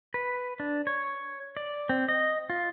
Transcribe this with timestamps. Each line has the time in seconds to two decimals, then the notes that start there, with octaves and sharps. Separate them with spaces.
0.14 B4
0.60 D4
0.87 C#5
1.57 D5
1.89 C4
2.08 D#5
2.50 F4